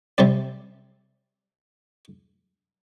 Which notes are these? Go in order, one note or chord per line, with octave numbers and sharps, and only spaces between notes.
C3 G3 C4 D5